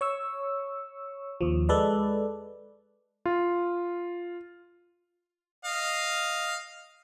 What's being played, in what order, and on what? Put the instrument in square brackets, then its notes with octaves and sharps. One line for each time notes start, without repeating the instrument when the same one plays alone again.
[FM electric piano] C#5 C#6 E6
D#2 F3
G#3 A4 B4 D5
[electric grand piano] F4
[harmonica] D#5 F5